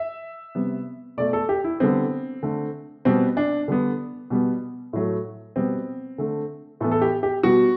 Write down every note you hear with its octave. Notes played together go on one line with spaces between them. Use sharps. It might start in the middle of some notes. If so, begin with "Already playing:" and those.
Already playing: E5
C3 G3 B3
B2 A3 D5
A4
G4
E4
D3 G3 B3 C4
D3 A3
B2 G3 B3 C4
D4
D3 G3 B3
B2 G3 B3
A2 F#3 A3
B2 G3 B3 C4
D3 A3
A2 E3 B3 A4
A4
G4
G4
B2 G3 B3 F#4